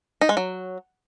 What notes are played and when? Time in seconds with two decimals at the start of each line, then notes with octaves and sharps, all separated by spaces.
0.21 D#4
0.29 G#3
0.37 F#3